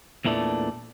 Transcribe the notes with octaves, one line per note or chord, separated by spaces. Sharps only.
E2 A#2 E3 A3 D4